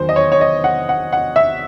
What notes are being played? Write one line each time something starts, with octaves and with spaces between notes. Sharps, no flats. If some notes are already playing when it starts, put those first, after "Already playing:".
Already playing: E2 D#3 F#3 C5
D#5
C#5
C#5
D#5
F#5
F#5
F#5
E5